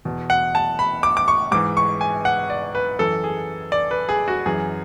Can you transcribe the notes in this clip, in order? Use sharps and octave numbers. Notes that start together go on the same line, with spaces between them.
E2 B2
F#5
A5
B5
D6
D6
C#6
G#2 E3 D6
C#6
G#5
F#5
D5
B4
F#2 E3 A4
G#4
D5
B4
G#4
F#4
F#2 E3 G#4